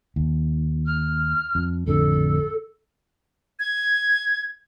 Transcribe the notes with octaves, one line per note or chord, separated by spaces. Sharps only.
D#2
F6
F2
A1 F2 D3 A4
G#6